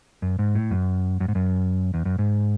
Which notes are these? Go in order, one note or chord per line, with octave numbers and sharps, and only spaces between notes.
F#2
G#2
A2
F#2
F#2
G#2
F#2
E2
F#2
G#2